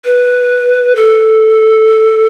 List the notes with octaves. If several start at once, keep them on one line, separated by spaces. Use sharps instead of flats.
B4
A4